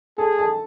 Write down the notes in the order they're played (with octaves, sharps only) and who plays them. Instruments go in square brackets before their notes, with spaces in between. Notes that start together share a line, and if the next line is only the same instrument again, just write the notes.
[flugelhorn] G#4 [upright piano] A4 A5
[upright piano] A4 A5